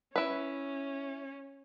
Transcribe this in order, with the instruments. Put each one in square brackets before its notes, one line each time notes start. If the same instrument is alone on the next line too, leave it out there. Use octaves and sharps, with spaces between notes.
[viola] C#4 [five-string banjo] E4 B4